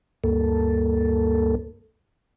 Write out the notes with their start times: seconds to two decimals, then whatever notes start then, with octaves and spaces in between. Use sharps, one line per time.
0.24 D2 G2 A#3 A4